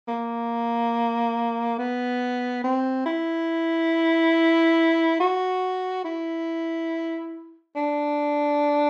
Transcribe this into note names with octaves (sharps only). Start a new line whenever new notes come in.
A#3
B3
C4
E4
F#4
E4
D4